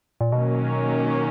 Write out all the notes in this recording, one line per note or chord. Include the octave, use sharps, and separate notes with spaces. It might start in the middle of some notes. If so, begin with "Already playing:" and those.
A#2
B2 D#3 F#3 A#3 C#4